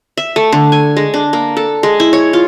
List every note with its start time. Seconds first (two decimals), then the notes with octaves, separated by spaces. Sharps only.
0.17 E5
0.36 A3
0.52 D3
0.72 G#5
0.97 G#3
1.14 D4
1.33 A#3
1.57 A4
1.83 G#3
2.00 E4
2.13 C#5
2.33 F4